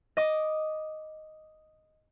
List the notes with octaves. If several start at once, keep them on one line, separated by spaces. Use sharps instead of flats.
D#5 D6